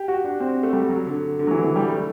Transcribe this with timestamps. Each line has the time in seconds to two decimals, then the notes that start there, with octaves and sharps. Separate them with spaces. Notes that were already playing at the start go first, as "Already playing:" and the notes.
Already playing: G4
0.08 F#4
0.24 D4
0.40 C4
0.63 A3
0.73 G3
0.89 F#3
1.07 D3
1.39 D3
1.47 F#3
1.51 E3
1.64 E3
1.76 G3
1.88 A3